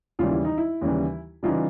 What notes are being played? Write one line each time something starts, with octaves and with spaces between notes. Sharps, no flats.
D#2 C#3 E3 G3 F4
E4
D#4
E4
D#2 C#3 E3 G3
C#3 E3 G3 D#4 F4